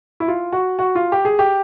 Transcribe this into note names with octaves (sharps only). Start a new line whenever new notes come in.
E4
F4
F#4
F#4
F4
G4
G#4
G4